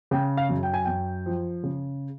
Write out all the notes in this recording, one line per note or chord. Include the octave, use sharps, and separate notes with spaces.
C#3 G5
F5
F#2
G5
G#5
F#2 G5
F3
C#3